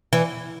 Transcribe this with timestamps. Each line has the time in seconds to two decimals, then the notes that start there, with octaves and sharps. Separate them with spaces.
0.13 E3